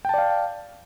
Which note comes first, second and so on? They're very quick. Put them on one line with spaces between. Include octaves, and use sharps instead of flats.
G5 A5 D5 F5